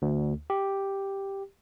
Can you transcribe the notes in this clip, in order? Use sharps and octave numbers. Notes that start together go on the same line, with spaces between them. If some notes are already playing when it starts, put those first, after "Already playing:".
D2
G4